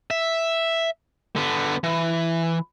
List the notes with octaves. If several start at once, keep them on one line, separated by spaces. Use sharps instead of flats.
E5
D3 B3
E3